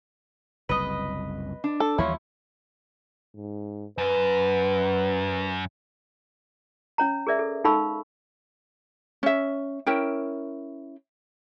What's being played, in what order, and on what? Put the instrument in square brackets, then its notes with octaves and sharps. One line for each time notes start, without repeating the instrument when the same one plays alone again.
[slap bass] F#1 C2 [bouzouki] B4 D#5
[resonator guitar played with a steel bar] D4
[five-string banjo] A4
[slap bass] D#2 E3 G3 [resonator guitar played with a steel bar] F3 C#5 [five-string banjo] E4
[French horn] G#2
[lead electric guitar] F#2 [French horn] B4
[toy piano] C#4 C#5 A#5
G#4 A#4 D5 E5
A4
D#4 A4 F5 B5 C#6 E6
[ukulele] C#4 E5
C#4 E4 A#4 G5